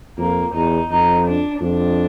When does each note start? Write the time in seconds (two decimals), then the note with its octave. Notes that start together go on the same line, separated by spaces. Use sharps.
0.18 F2 A#3
0.54 E2 D#4
0.90 F2 D#4
1.26 D4
1.61 F2 D4